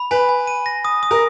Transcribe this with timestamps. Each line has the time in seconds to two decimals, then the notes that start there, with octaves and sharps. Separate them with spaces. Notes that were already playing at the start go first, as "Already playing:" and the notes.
Already playing: B5
0.11 B4 G#5
0.29 G#5
0.47 D#7
0.66 A#6
0.85 D#6
1.03 D#6
1.11 A#4